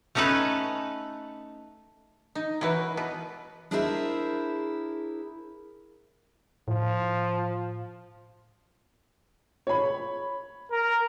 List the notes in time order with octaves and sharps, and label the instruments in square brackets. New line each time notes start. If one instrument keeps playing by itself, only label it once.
[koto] A3 C#4 D#4 A4 B4
D#4
[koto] E3 E4 [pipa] F#3 F#4 B4
[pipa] B2 [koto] B4
[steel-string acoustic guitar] D4 E4 G#4 A#4 C5 E5
[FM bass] A2 [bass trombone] F3
[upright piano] C#5 B5
[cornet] A#4